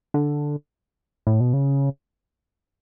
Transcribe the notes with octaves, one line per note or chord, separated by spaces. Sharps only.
D3
A2
B2
C#3